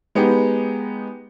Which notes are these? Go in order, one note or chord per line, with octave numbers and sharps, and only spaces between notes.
G#3 B3 D#4 G4